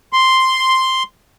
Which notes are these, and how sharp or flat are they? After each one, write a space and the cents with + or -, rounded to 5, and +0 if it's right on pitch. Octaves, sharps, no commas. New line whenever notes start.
C6 +0